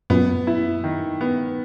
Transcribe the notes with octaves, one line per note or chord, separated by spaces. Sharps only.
F#2 A#2 B3
E4
D#3
B3